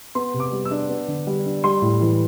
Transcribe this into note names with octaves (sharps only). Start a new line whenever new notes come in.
B3 C6
C3
D6
G3
E6
D4
B3
D3
G3
D4
G3 C6
A2
E3